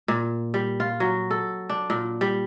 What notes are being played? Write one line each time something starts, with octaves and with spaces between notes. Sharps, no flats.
A#2
G3
F4
F#3
A4
D4
A#2
G3